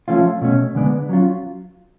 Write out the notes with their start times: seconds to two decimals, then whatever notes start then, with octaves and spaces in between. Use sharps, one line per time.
0.08 F3 A3 C#4 F4
0.41 B2 A3 C#4
0.75 D3 G#3 B3 D4
1.09 F#3 C#4 F4